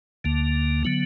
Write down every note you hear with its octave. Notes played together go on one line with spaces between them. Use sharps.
D2 D3 A#3
D3 F#3 B3